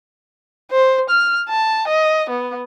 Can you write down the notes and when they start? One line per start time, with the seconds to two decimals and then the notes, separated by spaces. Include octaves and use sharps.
0.71 C5
1.10 F6
1.49 A5
1.88 D#5
2.30 B3